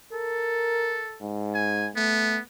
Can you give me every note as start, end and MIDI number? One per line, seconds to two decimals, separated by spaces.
0.13 1.24 69
0.13 1.06 70
1.22 1.89 44
1.54 1.87 80
1.96 2.38 57
1.96 2.41 59